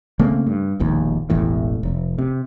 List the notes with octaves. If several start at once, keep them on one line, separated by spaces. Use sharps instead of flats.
C#3 A3 A#3 C4
G2
E1 A#1 D#2
E1 A1 E2 A2
F1
C3